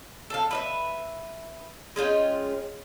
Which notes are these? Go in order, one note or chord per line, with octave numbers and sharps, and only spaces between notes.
A4 F5
B4 D#5 E5
G#3 C#4 F4 G5